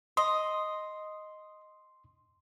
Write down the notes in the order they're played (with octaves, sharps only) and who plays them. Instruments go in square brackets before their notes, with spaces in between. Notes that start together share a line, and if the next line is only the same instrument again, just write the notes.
[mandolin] D#5 [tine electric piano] C6